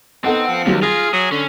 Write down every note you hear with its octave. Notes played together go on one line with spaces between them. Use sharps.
B3 C4 D#4 A4 F#5
F3
C#2 D#3 F#3 G3
F4 G#4 F6 A#6
F#3 G#4
D3 C#4